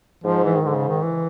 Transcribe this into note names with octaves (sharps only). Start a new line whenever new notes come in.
G#2 F3
E3
D#3
G#2 D3
C#3
D#3
E3